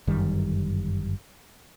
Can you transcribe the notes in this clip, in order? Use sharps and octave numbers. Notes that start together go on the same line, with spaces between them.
G1 F#2 D#3 G3